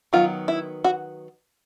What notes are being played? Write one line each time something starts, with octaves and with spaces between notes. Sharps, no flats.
D#3 F#3 B3 F4
E4
F#4